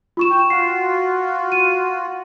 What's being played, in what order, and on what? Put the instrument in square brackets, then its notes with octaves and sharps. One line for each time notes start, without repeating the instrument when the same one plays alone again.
[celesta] F4 C#6 E7
[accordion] G5
[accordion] F4 F#4 [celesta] C7
[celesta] D#7